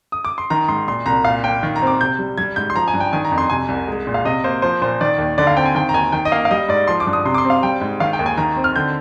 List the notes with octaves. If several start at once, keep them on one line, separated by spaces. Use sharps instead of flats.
D#6
D6
C6
D#3 A#5
G#2 C6
A#2 C6
C2 A#5
A#2 F5
A#3 G5
D#3
A#5
C4
D6
C3 G6
G3
G3 G#6
G#2 G6
C6
F3 A#5
G#5
G2
G5
D#3 G#5
A#5
F2
C6
C3 G#5
C2
G#3
A#2
F5
C3 D#5
A#3 C5
F3 C5
A#2 C5
D#3 D5
D#2
D3 D5
F5
C4 G5
G#5
D#3 G5
A#5
D#2 G#5
D#3 G5
D#5
A#3 F5
F5
G3 D#5
G#2 D5
F3 C6
D6
G2
D#6
C3 C6
D6
C6
C4
F5
G3 G5
G#2
D#3 F5
G5
D#2
G#5
D#3 A#5
C4
F6
D3 G6